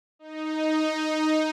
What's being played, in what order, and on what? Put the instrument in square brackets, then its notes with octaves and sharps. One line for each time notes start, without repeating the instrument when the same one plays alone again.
[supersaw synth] D#4